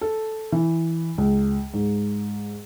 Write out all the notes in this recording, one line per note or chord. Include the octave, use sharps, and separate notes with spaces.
A4
E3
C#2
G#2